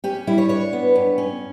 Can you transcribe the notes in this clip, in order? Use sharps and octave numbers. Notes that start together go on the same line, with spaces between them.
C#4 G4
G3 E4
C#5
D4 C#5
B3
G2
C#4